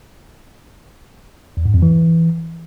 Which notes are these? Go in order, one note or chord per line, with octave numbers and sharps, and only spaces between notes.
E2
G#2
F2
E3